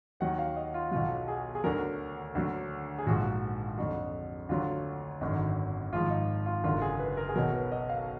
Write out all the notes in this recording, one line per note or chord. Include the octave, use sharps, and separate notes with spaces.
D#2 D#3 F#3 F#5
F5
D#5
F4
B1 B2 F#3 F4
G#4
G#4
D2 D3 F#3 A#4
D2 D3 F#3
G#4
A#1 G#2 F3 F#4
F2 D3 F#3 F#4
D2 D3 F#3 F4
G#1 F#2 D3 D#4
G#1 G#2 F3 F4
D#4
F4
F#1 F#2 D3 F4
G#4
B4
A#4
G#4
B1 B2 F#3 A#4
B4
D#5
F5